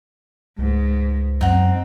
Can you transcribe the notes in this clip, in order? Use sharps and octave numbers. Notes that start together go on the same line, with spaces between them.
C#2 G#2
F#2 C4 D#4 F#5